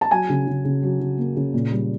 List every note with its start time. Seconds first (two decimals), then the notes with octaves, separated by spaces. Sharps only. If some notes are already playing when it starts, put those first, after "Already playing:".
0.01 A5
0.11 F#3 G#5
0.29 C#3
0.47 C#3
0.65 C#3
0.83 F#3
1.00 C#3
1.18 A#3
1.36 C#3
1.54 A#2
1.71 G3